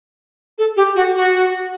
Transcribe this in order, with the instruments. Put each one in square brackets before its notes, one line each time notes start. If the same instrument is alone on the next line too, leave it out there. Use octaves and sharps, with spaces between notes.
[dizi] A4
G4
F#4
F#4